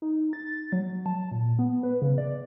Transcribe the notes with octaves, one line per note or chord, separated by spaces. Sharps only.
D#4
A6
F#3
A5
A#2
B3
B4
C#3
D5